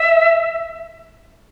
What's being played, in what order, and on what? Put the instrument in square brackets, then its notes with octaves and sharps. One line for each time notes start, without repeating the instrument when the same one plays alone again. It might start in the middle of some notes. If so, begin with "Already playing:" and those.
Already playing: [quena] E5